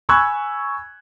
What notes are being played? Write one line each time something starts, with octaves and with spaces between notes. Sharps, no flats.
G#5 B5 C#6 E6 F#6 G#6